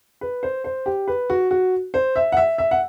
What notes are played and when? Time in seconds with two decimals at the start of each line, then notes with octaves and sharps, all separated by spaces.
0.21 B4
0.43 C5
0.64 C5
0.86 G4
1.08 B4
1.30 F#4
1.51 F#4
1.94 C5
2.16 E5
2.32 F#5
2.37 E5
2.58 E5
2.71 F#5